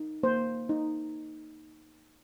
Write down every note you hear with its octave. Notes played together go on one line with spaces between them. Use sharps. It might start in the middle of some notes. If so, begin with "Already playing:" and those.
Already playing: D#4
A#3 C5
D#4